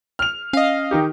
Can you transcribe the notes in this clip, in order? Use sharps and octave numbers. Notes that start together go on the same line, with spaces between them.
F6 F7
C#4 D#5 F5
D#3 D#4 G4